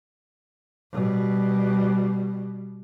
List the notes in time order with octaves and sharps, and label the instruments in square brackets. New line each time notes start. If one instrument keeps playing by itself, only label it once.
[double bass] B2 G3